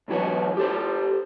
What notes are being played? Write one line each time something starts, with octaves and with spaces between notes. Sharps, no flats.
B1 G#2 E3 F#3 B4 C#5
G4 A4 C5